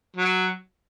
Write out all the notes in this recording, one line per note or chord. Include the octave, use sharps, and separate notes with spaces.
F#3